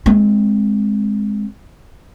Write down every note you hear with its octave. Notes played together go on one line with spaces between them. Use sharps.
G#3 C4